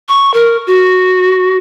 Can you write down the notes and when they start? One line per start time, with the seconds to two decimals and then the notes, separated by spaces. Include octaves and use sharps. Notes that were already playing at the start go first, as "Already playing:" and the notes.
0.09 C#6
0.34 A#4
0.67 F#4